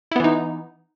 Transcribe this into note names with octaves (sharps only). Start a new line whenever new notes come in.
E3 B3 D#4 E4